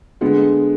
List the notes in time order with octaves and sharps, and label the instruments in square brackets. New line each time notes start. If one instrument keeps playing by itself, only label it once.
[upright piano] D3 G#3 B3